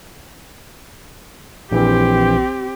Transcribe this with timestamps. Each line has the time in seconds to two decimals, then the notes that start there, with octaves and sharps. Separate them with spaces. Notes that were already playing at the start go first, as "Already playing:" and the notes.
1.72 A#1 E3 C4 G4